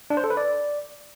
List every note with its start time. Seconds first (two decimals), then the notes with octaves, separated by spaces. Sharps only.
0.10 D4
0.17 C5
0.24 A4
0.30 B4
0.37 D5